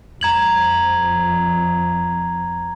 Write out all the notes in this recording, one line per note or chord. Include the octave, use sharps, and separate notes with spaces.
F2 A#5 G#6 F#7